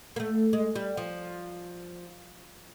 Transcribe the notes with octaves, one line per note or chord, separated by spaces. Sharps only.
A#3
A3
G#3
G3
F3